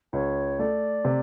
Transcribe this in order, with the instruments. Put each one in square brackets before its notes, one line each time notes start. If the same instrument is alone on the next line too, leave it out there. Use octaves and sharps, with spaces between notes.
[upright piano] C#2 [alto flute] C#5
[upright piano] A3 [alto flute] D5
[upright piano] C3